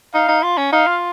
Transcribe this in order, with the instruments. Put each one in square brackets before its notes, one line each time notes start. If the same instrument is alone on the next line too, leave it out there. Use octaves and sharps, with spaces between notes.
[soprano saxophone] D#4 [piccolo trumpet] F5
[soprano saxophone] D#4
F4
C#4
[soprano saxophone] D#4 [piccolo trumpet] F5
[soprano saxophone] F4